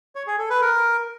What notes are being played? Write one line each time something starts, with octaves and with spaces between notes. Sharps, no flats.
C#5
G#4
A4
B4
A#4